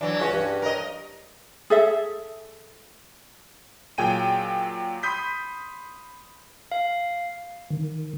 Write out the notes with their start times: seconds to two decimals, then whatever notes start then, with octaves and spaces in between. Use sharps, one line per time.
0.01 E3 F#3 D4
0.19 C#2 C#4 F#4
0.33 G2
0.62 A#4 D#5
1.70 G#4 A4 E5
3.98 A#2 F#3 G#4 G5 G#5 D#7
5.03 B5 C6 D#6 G6 B6
6.72 F5
7.70 D#3